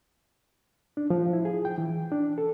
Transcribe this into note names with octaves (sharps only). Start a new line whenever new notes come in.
D4
F3
E4
G#4
G5
E3
D4
A4